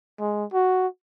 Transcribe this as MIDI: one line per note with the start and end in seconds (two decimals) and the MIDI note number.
0.19 0.44 56
0.53 0.87 66